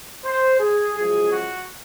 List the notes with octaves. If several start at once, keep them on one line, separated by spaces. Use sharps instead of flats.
C5
G#4
F#2 C#3 F3 G#3 G#4
F#4